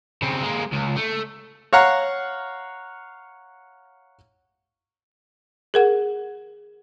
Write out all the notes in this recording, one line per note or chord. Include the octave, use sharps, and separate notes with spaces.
C#3 C4
G#3 A#3
C#2
A3
C#5 F5 F#5 A#5
G#4 A#4 F#5